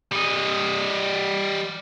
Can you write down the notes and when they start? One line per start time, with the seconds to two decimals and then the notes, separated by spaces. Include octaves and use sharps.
0.12 G3 D#5